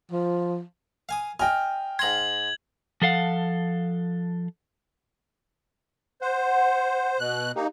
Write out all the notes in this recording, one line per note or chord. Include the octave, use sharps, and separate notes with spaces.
F3
F5 G#5 D#6
D#5 G5 G#5 F6
G#2 A#5 C6 G#6 F#7
F3 A4 F5 F#5
C5 F#5
B2 F#6
A#3 D#4 G4